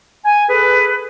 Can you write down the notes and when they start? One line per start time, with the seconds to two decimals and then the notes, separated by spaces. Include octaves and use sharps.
0.25 G#5
0.48 G#4 A4 B4